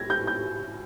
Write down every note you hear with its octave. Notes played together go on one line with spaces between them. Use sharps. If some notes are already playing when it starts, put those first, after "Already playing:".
Already playing: G#6 A#6
G6
G6